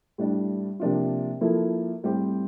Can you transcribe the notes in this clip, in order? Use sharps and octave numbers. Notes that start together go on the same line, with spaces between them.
A2 G3 D4
C3 F3 A#3 D4 F4
F3 A#3 E4 A4
A2 G3 C4 G4